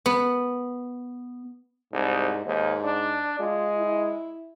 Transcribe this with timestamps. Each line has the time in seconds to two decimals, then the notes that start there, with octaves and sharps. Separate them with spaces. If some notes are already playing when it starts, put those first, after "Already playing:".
0.06 B3
1.93 C2 G#2
2.46 D#2 G#2
2.84 D4
3.39 G#3 F4
3.77 E4